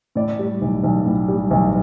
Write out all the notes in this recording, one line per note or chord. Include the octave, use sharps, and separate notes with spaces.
A2 D5
G3
B1
B1
A2
G3
B1